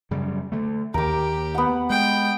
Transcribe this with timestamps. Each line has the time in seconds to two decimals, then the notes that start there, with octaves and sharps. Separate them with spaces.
0.11 F#2 C#3 G3
0.52 D3 A3
0.94 D#2 G4 A#4 D6
1.55 B3 F#5
1.90 G#3 G5